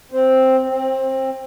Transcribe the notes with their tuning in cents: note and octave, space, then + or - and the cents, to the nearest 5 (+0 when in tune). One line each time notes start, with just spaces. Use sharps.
C4 +0
C4 +20